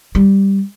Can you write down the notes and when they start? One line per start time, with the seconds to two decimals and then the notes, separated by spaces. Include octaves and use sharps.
0.15 G3